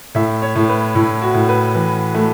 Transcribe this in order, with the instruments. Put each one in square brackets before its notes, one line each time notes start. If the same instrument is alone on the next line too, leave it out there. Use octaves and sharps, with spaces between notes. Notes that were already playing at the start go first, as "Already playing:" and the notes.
[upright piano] A2 [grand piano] E5
[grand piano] C#5
[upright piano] A2
[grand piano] B4
[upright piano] A2 [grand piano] E4
[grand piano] F#4
[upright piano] A2
[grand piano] B4
[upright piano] E3
A3